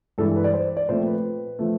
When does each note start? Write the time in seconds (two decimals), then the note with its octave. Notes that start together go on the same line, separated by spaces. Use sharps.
0.18 G2 E3 G#3 A4
0.36 B4
0.44 D5
0.54 C5
0.77 D5
0.89 A#2 F3 A3 C4 C5
1.06 B4
1.59 F3 A3